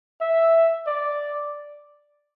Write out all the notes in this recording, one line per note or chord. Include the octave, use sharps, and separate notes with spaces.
E5
D5